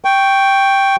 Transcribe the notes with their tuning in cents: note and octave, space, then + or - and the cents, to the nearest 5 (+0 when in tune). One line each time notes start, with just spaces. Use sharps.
G5 +0 C#6 +0